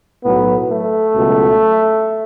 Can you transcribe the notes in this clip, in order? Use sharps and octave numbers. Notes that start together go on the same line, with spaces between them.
B1 A2 F#3 B3
A3
C#2 B2 F#3